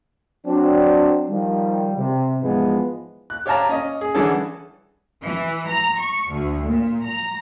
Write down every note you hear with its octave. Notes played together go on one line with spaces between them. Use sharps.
F#3 C4 D4
D#3 F3 G3
C3
G#2 E3 F3 G#3 B3
F#6
G4 C#5 F5 A5 A#5
C#4 D#5
G#4
D3 E3 G3 C#4 G#4 A4
E3
A#5
C#6
D2
A#2
A#5